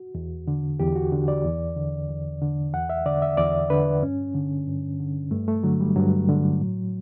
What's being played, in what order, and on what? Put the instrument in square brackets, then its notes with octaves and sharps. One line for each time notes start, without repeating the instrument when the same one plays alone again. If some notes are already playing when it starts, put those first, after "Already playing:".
Already playing: [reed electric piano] F#4
E2
D3
E2 G4
F#4
D3
D5
E2
D3
E2
D3
E2 F#5
E5
D3 D5
E5
E2 D5
D3 B4
G2 C#4
D3
G2
D3
G2 A3
A3
D3 F#3
G3
G2 F#3
D3
A2